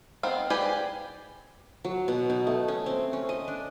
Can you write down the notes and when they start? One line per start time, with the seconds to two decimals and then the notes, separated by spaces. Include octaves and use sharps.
0.23 B3 C4 D#4 F5
0.50 G4 G#4 B4 D5 G#5
1.84 F#3
2.08 B2
2.30 D#4
2.47 A3
2.68 C#4
2.86 C4
3.13 C#4
3.29 D#5
3.48 D4